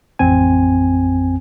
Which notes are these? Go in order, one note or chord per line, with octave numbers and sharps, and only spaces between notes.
A1 F2 C4 G#5